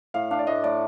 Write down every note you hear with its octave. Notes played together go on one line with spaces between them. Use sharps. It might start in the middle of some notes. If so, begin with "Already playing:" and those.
A2 F5
D4 F5
D5
A2 D#5
A2 D5